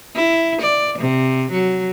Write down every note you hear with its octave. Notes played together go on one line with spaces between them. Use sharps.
E4
D5
C3
F#3